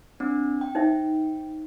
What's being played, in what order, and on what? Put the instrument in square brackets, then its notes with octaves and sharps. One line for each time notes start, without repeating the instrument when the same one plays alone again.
[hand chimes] C4 D4
G5
[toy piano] D#4 C5 E5